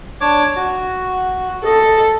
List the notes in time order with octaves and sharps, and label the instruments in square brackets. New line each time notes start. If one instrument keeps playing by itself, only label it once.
[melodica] D4 C#5 D6
F#4
[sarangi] A4 [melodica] D#5